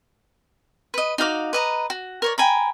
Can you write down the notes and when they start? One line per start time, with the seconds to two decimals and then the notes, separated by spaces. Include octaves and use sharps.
0.94 B4 D#5
1.18 D#4 F#4 F5 D6
1.53 B4 D#5 A#5
1.90 F#4
2.22 A#4 C#5 D5
2.38 G5 G#5 A#5 B5